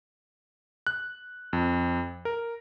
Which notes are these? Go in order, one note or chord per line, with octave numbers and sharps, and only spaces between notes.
F#6
F2
A#4